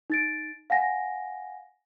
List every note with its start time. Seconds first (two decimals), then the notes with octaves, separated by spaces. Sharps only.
0.10 D#4 A6 D7
0.70 F5 F#5 G#5 A#6